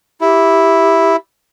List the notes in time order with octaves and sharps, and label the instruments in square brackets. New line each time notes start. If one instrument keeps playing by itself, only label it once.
[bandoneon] E4 [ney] G4